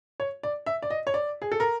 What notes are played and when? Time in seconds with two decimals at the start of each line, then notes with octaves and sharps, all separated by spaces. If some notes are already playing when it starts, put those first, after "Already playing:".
0.20 C#5
0.43 D5
0.66 E5
0.82 D5
0.90 D#5
1.07 C#5
1.14 D5
1.42 G#4
1.52 A4
1.60 A#4